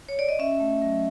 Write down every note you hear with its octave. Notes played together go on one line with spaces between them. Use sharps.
C#5
D5
D#5
C#4 E5
A3
F#3